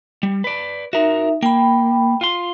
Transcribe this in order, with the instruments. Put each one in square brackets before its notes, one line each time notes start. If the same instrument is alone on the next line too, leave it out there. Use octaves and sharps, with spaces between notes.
[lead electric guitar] G3
B4 D5
[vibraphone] D#4 E5 [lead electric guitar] F#4 A#4
[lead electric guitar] A#3 [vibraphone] G5 B5
[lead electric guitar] F4 C6